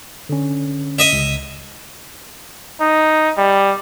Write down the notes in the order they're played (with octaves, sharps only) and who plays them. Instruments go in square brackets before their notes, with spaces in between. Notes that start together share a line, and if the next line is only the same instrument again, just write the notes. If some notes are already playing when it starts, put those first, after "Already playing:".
[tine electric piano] D3 C#4
[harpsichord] D#5 E5
[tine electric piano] C#2
[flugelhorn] D#4
G3